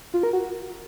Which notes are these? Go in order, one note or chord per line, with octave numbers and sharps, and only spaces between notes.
F4
A#4
F#4